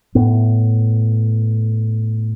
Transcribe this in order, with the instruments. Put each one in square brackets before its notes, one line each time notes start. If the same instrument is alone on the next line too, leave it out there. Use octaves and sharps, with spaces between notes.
[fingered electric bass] A2 B3